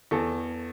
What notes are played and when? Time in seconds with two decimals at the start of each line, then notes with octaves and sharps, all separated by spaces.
0.11 E2 A4